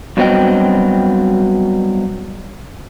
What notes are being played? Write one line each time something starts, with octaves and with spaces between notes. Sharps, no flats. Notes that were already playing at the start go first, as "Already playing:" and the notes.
G2 B2 F#3 C4 D#5 G5